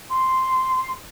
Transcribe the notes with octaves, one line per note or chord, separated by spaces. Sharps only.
C6